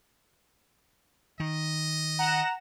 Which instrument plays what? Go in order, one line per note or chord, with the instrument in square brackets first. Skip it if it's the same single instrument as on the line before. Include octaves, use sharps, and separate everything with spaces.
[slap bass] D#3 [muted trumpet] D#5
[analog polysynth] F#5 A#6 E7 [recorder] A#5